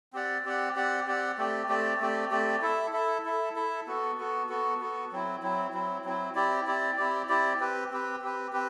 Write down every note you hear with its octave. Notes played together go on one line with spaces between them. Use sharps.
C4 G4 D5 F#5
C4 G4 D5 F#5
C4 G4 D5 F#5
C4 G4 D5 F#5
A3 C4 G4 D5
A3 C4 G4 D5
A3 C4 G4 D5
A3 C4 G4 D5
E4 A4 E5
E4 A4 E5
E4 A4 E5
E4 A4 E5
B3 F#4 A4
B3 F#4 A4
B3 F#4 A4
B3 F#4 A4
F#3 C4 E4
F#3 C4 E4
F#3 C4 E4
F#3 C4 E4
C4 E4 G4 D5
C4 E4 G4 D5
C4 E4 G4 D5
C4 E4 G4 D5
C4 G4 B4
C4 G4 B4
C4 G4 B4
C4 G4 B4